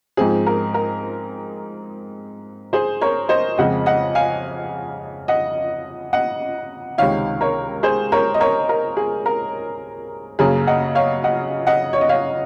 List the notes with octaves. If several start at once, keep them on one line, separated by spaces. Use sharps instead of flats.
G#2 F3 C4 G#4
A#4
A#4
G#4 C5
A#4 C#5
C5 D#5
F2 C#3 G#3 C4 D#5 F#5
D#5 F#5
F5 G#5
D#5 F#5
D#5 F#5
C#2 C3 D#3 C#5 F5
A#4 C#5
G#4 C5
A#4 C#5
D#5
A#4 C#5
A#4
G#4
A#4
F#2 C#3 F#3 A#3 G#4
D#5 F#5
C#5 F5
D#5 F#5
D#5 F#5
C#5
D#5
C#5 F5